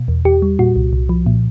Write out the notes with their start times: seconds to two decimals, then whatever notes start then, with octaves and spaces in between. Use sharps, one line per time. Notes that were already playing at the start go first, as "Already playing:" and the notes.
Already playing: B2
0.08 E2
0.25 E2 G4
0.42 G3
0.59 A#2 F#4
0.76 C2
0.93 C2
1.09 F3
1.26 A#2